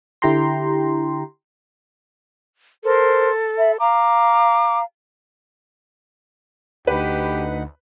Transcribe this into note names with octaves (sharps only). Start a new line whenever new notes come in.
D3 E4 G4 G5 A#5 C6
A4 A#4 C5 C6
E5 B5
F5 A#5 D6
D2 D#4 G4 B4 F#5